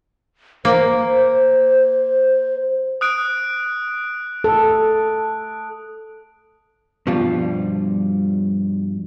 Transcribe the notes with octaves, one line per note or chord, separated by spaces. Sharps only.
A#3 C5
D#6 F#6 D7
A4
G2 B2 F3 G3 F4